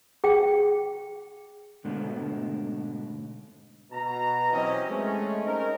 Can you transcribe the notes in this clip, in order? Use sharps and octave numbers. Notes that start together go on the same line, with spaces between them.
G#4 G5
G#2 B2 D3 G#3 A3 D4
B2 A#5
E3 F#3 C4 C#4 G4 D#5
G#3 A3 C#4
C4 C#4 D#4 A#4